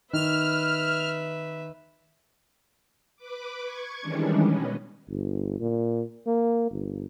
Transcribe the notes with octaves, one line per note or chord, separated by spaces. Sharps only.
D#3 B4 E5 F6
B4 D6
C#6 G#6
D#3 E3 G3 G#3 C#4 D4
B2 C#4 B4 D#5
G1
A#2
A#3
G1